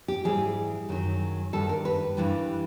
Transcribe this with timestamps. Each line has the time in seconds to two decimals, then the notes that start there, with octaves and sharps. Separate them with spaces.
0.08 G4
0.24 G#2 E3 G3 G#4
0.89 F#2 D#3 F#3
1.53 G2 D#3 G3 A4
1.69 A#4
1.85 B4
2.17 G2 E3 G3